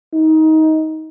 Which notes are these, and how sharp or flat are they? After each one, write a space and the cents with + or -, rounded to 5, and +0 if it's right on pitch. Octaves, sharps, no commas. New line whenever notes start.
D#4 +20